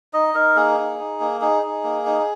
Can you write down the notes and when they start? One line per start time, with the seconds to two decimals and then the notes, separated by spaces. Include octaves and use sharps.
0.13 D#4 D#5
0.34 D#4 A#4
0.56 A#3 G#4
0.78 D#4
0.99 D#4
1.20 A#3
1.41 D#4 G#4
1.63 D#4
1.84 A#3
2.06 D#4